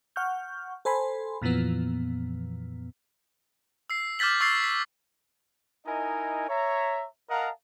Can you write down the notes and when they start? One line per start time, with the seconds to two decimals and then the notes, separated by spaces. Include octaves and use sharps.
0.16 F#5 C#6 F6 G6
0.85 A4 C5 G#5 B5 C6
1.42 F2 A#2 E3 F3 B3
3.90 E6 C7
4.19 D6 F6 G6 A6 B6 F#7
4.41 C#6 E6 A6 C7
4.64 B6
5.86 D#4 E4 A#4 D#5 G#5
6.49 C#5 E5 A#5
7.30 A#4 D#5 F5 F#5 A5 A#5